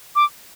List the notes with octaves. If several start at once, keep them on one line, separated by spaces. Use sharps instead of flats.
D6